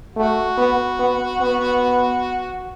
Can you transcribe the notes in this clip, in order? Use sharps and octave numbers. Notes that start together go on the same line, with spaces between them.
A3 F#4
B3
B3
B3